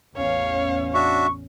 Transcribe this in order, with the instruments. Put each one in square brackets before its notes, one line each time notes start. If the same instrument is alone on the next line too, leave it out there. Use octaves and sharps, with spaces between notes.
[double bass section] A1 E2 C#4 [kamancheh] C#5 F5
[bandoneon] D4 F#4 E5 [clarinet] C#6